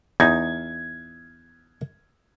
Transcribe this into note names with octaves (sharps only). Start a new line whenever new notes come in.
E2 D#4 G#6